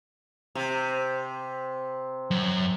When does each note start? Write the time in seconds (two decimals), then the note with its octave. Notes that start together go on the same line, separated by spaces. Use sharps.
0.55 C3
2.31 F#2